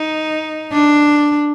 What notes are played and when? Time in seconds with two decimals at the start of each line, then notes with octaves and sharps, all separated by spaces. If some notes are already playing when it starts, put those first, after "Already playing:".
Already playing: D#4
0.72 D4